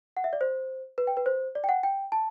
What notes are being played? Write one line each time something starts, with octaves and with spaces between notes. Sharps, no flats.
F#5
E5
D5
C5
B4
G5
B4
C5
D5
G5
F#5
G5
A5